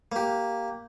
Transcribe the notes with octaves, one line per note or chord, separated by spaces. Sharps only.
A#3 G4